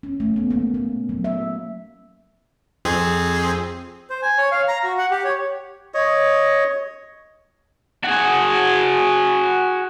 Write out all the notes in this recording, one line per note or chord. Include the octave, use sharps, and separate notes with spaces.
C#4
A3
B3
A#3
A#3
F#3
E5
F2 C4 G#4
C5
G#5
C#5
F5
A#5
F#4
F#5
G4
C#5
C#5 D#5
F#4 G#4